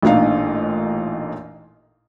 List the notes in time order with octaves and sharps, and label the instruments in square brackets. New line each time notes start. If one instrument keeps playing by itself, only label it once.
[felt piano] A1 A#2 D4 D#4 F5